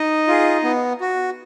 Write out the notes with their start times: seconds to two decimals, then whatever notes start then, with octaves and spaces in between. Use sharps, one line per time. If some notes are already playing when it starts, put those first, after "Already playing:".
Already playing: D#4 D#5
0.28 F4 G#4
0.64 B3
1.01 F#4